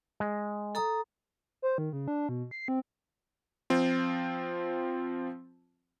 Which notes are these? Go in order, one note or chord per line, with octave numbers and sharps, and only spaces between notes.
G#3
A4 A#5 D#6
C5
D#3
C#3
D4
B2
C7
C4
F3 C4 F4